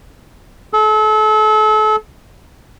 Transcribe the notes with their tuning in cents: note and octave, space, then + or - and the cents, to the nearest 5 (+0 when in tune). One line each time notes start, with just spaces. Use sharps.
A4 -35